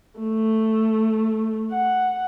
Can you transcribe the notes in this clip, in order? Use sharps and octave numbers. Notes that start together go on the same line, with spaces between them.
A3
F#5